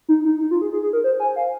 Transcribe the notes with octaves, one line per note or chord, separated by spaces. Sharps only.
D#4
D#4
D#4
F4
G#4
G#4
G#4
A#4
C5
G#5
F5